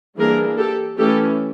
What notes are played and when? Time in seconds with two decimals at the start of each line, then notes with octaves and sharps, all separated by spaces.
0.18 E3 G3 A#3 D4 G#4 A#4
0.57 G4 A4
0.97 E3 A3 C#4 G4 A4